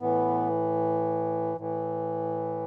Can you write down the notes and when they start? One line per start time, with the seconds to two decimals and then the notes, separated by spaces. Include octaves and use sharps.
0.01 A2 E3 B3
1.58 A2 E3